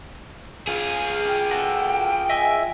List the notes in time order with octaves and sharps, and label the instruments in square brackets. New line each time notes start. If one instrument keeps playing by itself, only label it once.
[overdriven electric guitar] F4 G#4
[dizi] G5
[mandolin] F#4 A4
D#5 E5 G#5